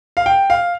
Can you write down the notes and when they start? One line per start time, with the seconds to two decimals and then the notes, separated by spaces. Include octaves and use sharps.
0.17 F5
0.26 G5
0.50 F5